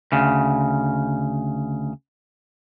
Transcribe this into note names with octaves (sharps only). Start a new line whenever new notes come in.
D2 C#3